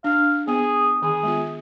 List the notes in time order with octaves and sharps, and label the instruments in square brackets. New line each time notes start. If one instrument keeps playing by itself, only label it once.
[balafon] D4 [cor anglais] F5
[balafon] B3 [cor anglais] G#4
[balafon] D#3 [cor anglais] G#4
[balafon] G#3 B3 F4